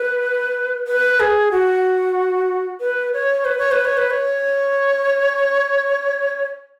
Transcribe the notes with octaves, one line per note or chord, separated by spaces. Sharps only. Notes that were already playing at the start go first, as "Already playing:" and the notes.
Already playing: B4
B4
G#4
F#4
B4
C#5
B4
C#5
B4
C#5
B4
C#5